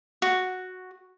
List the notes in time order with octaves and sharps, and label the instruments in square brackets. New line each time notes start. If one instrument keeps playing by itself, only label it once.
[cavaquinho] F#4